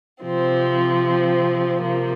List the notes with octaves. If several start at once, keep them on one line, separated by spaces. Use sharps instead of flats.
C3 F3 C4
C3 F3 A#3